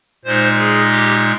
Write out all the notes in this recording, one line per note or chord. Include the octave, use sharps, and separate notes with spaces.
A#2 G#3 D#4 C5
G#4
G4